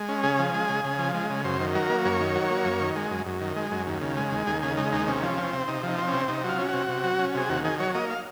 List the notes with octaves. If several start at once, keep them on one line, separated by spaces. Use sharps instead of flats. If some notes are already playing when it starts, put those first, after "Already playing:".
Already playing: G#3
C#4
C#3 G#4
F3
G#3
C#3
C#3
F3
G#3
C#3
F#2 C5
D#3
F#3 A#4
A#3
F#2 C#5
D#3
F#3
A#3
F#2
D#3
G#3
F#2
F#2
D#3
G#3
F#2
D#2
C#3
G#3
D#2
D#2 G#4
C#3 G#4
G#3 D#4
D#2 D#4
C3 C#4
F3
C4
C3
C3 D#4
F3 D#4
C4
C3 C#4
C3 D#4
F#3 F4
C#4
C3 F#4
C3
F#3
C#4
C3 G#4
D#2 F#4
D#3 G#4
F#3 C#5
A#3 D#5
F5